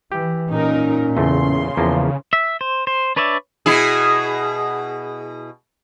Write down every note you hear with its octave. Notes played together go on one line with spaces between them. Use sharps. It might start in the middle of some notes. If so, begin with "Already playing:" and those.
E3 G4
A#2 C#4 D#4 A#4
E2 C#3 A3 C6
E2 F3 A#3
E5
C5
C5
D4 B4 C#5 D5 E5
B2 E4 G#4